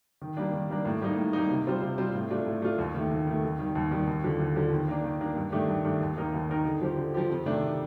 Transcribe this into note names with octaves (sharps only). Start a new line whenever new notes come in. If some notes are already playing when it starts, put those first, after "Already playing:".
D#3
G3 A#3 D4
D#3
G3 A#3 D4
A2
G3 A#3 D#4
A2
G3 A#3 D#4
C3
G3 C4 F4 C5
C3
G3 C4 F4 C5
A2
A3 D4 F4
A2
A3 D4 F4
D#2
D#3 A3
D#2
D#3 A3
D#2
D#3 G3
D#2
D#3 G3
D#2
D3 F3
D#2
D3 F3
D#3
A#3 D4
D#3
A#3 D4
G2
D#3 A3 D4 G4
G2
D#3 A3 D4 G4
D#2
D#3 A#3 D#4 A#4
D#2
D#3 A#3 D#4 A#4
D3
F3 C4 G4
D3
F3 C4 G4
F2
C3 D#3 A3 D4